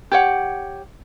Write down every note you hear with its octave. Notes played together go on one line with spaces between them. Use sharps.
G4 C#5 F#5